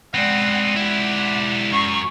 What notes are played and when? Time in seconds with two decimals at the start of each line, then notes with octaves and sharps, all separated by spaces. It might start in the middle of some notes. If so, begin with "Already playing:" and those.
0.14 G#3 B3 C4 D5 F#5
0.76 E4 G4 F#5
1.72 F#2 C#6